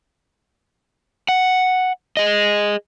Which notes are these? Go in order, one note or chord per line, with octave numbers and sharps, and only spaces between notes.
F#5
G#4 D#5